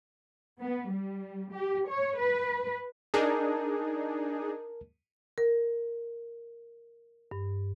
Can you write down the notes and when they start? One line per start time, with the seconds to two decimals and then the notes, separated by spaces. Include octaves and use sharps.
0.61 B3
0.90 G3
1.53 G4
1.89 C#5
2.18 B4
3.14 D4 D#4 G#4 A#4 A5
5.38 A#4
7.31 G2